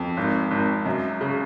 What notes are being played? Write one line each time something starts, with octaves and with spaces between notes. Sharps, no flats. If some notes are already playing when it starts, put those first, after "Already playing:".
Already playing: F2
G#1
G#1
F#2
C#3